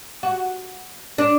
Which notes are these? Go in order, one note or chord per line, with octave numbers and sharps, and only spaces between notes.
F#4
D4